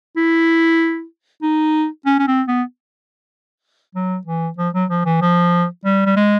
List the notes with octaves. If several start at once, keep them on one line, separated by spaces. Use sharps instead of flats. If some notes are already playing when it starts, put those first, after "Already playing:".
E4
D#4
C#4
C#4
C4
B3
F#3
E3
F3
F#3
F3
E3
F3
G3
G3
G#3